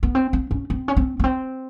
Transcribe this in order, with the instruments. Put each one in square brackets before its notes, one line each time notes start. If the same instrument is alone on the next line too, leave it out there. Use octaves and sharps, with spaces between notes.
[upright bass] B3
C4
C4
C#4
C4
C#4
C4
B3
C4